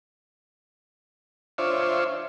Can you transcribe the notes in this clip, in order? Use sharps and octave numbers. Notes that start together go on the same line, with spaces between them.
D4 F4 C5 C#5 E5